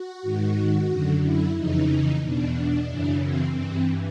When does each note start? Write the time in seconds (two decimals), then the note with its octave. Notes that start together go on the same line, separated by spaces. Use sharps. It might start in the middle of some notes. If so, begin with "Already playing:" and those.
Already playing: F#4
0.23 G#2 D#3
0.89 F#2 D3
1.22 E4
1.55 F2 C#3 E3 D#4
2.22 E2 B2 D4
2.88 F#2 C#3 E3
3.22 C4
3.55 G2 E3